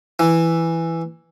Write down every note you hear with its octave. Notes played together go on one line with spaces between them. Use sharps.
E3